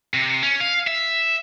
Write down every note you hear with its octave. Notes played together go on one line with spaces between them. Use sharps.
C3
C#4
F5
E5